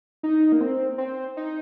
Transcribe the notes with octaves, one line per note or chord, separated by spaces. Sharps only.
D#4
A#3
C4
C4
D#4